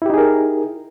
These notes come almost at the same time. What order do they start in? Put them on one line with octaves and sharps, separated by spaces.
E4 G4 D#4 G#4 A#4